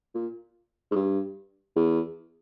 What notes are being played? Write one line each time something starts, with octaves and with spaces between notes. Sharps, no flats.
A#2
G#2
G2
E2